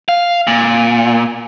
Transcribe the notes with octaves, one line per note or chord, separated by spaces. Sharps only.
F5
A#2